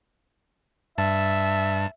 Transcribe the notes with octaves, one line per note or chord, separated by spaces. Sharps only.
G2 E5 A5